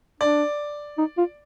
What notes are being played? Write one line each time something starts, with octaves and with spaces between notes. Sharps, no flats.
D4 D5
D#4
F4